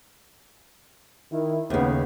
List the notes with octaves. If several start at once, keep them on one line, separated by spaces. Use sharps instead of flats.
D#3 E4
D#2 C#3 A3 B3